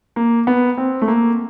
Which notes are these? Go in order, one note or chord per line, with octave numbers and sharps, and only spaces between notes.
A#3
B3
C4
A3
A#3